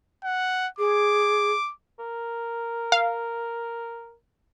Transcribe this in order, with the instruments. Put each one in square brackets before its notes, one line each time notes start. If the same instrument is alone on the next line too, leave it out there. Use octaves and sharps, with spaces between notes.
[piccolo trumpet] F#5
[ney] G#4 [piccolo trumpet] D6
[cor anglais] A#4
[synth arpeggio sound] F5